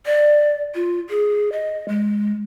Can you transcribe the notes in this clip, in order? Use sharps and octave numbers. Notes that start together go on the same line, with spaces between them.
D5
F4
G#4
D#5
G#3